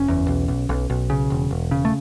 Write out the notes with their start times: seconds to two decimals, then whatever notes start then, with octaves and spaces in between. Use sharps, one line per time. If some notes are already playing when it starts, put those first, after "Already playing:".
Already playing: F#1 C#4
0.08 E2
0.28 B1
0.48 B1
0.69 B1
0.90 B1
1.10 C#3
1.30 E1
1.51 E1
1.71 C#3
1.85 A3